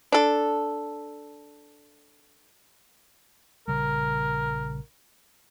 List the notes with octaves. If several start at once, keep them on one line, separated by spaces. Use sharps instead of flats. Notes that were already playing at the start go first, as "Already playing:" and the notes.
D4 A4
A#1 C#3 G3 A#4